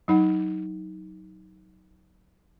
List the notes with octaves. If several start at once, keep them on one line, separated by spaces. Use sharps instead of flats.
F#3 D#4 F#5